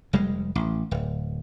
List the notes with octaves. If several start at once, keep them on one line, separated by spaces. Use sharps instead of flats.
F1 G3 G#3
A1
D1